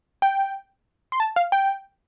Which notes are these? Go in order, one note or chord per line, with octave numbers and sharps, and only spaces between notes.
G5
C6
A5
F5
G5